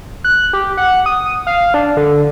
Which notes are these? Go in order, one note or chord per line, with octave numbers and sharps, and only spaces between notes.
F#6
G4
F#5
D#6
F5
D4
D3